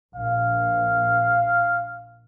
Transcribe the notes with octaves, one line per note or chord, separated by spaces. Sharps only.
A#1 F5